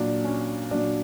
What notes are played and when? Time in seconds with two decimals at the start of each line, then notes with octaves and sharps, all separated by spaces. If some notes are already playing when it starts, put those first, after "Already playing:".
Already playing: A#2 F#3 D4
0.24 C#4
0.71 A#2 F#3 D4